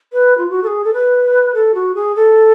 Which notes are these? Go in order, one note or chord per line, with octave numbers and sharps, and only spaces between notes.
B4
F4
F#4
A4
G#4
A4
B4
A4
F#4
G#4
A4